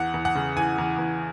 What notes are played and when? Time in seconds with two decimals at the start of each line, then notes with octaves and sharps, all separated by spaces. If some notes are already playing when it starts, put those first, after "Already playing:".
Already playing: E2 F#5
0.14 E2
0.25 F#5
0.35 C#3
0.57 E3 G#5
0.78 E2
0.98 E2